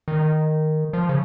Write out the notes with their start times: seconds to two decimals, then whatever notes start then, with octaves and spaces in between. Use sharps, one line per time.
0.08 D#3
0.93 F3
1.09 C#3